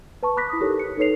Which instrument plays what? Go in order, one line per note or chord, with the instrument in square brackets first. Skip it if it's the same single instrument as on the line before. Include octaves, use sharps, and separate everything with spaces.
[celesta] B4 A5 C#6
B5 D6 F#6 A#6 B6
E4 D#6
D#4 G4 A4 A#4 C#5
C#7
D#4 A4 B4 C#5 C7 F7